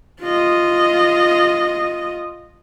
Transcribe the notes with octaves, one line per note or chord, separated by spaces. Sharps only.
F4 D#5